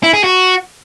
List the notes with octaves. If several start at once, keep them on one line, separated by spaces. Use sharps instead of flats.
E4
G#4
F#4